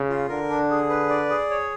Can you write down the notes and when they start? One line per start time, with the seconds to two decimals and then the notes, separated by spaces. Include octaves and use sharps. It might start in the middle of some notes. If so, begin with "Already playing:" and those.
Already playing: C#3
0.09 F4
0.29 D3 A#4
0.50 D4
0.70 G#4
0.89 B4
1.09 D5
1.30 G#4
1.50 C#5